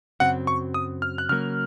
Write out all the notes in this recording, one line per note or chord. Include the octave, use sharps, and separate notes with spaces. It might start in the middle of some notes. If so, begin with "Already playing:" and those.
F#2 C#3 F#3 C4 F#5
C#6
D#6
F6
F#6
C#3 F#3 A#3 F6